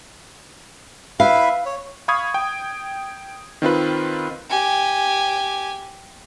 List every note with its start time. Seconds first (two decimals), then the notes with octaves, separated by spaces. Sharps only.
1.20 E4 B4 E5 F5
1.66 C#5
2.08 F5 B5 C#6 D#6 G#6
2.34 G5
3.62 D#3 C4 F4 B4
4.50 G4 G#5